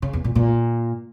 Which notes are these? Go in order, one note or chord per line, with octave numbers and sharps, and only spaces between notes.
C#3
E2
A#2
A#2